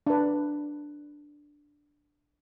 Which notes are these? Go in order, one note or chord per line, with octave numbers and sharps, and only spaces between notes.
D4 B4